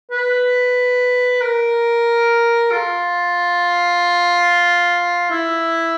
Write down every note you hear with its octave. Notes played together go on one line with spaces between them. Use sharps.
B4
A#4
F4
E4